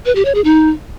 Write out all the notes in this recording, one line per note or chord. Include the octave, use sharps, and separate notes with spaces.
B4
G4
C#5
G#4
D#4